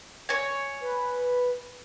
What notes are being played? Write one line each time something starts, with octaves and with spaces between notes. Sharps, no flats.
C#5 G#5
B4